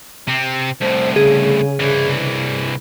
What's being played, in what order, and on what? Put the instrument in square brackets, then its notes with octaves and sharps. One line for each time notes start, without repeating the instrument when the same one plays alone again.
[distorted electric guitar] C3 C4
[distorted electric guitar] C2 A2 [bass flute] C5
[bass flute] C#3 [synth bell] G#4
[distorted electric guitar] C2 E3